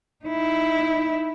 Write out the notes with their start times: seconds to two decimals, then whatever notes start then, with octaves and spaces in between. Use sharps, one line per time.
0.25 D#4 E4